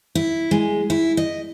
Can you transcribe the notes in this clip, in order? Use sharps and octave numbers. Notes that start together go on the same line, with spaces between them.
E4
G#3
E4
D#5